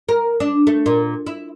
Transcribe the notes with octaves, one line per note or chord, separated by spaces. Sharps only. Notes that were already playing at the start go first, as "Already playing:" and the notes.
A#4
D4
A3
A#2
E4